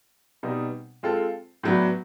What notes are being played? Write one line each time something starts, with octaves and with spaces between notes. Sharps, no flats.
B2 G3 C4 D#4
G#3 C4 F4 A4
A2 F#3 B3 D4